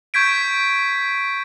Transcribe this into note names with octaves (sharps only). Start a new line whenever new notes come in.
C#6 G6 G#6 B6 D7